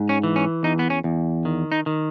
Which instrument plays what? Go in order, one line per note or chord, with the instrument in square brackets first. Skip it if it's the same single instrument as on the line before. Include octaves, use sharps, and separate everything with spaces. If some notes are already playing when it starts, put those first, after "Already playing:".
Already playing: [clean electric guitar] G#2
C#4
E3
C#4
E2 D#4
B3
C#4
E2
D#3
D#4
D#3